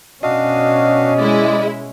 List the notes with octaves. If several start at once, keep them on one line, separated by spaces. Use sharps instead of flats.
B2 C#4 D4 F#4 D#5 F5
G#3 E4 D5